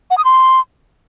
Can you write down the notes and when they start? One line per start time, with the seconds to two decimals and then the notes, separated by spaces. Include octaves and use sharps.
0.10 F#5
0.18 D#6
0.25 C6